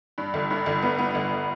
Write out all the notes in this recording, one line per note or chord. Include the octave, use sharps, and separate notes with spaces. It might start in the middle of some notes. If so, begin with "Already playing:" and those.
G2
G1
G2
G1
B3
B3
G1